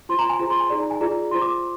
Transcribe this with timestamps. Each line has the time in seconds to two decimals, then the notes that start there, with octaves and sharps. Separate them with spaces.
0.09 F4 C5 C6
0.19 A#5
0.29 G#5
0.39 F4 G#4 C5 A#5
0.50 C6
0.60 G#5
0.70 D#4 G#4 D5
0.80 A#5
0.90 G#5
1.01 F4 G#4 D5 A#5
1.31 F4 C5 C6
1.42 D6